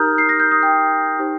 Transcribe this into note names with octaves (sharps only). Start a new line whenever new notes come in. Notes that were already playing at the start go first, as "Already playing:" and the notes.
Already playing: D#4 G4 A#4 A#5 D#6 F6 G6
C7
A#6
G6
D#6
G5
D#4 G4 C5